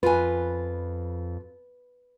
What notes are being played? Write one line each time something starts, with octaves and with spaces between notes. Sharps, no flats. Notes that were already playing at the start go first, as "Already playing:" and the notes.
F2 F4 B4 G#5